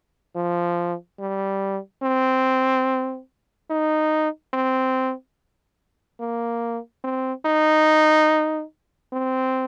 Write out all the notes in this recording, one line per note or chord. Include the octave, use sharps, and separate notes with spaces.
F3
G3
C4
D#4
C4
A#3
C4
D#4
C4